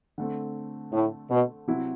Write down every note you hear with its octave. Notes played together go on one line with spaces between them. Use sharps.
D3 A3 C4
A2
B2
C3 F#3 C4 E4